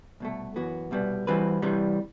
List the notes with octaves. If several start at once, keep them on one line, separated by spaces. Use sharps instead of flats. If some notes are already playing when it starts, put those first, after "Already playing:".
C2 B2 A3
F#2 E3 B3 F#4
C2 B2 G3 B3
E3 G3 C4 F#4 B4
C2 C3 E3 G3